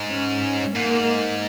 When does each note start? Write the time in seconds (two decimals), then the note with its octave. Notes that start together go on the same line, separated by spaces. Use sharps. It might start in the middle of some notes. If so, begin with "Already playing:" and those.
Already playing: G#2
0.10 C#4
0.75 G#2 A#3